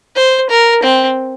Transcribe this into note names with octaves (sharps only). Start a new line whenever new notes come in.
C5
A#4
C4